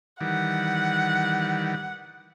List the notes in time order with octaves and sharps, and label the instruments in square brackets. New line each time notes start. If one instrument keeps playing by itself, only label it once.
[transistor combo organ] D#3 E3 G3 [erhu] F#5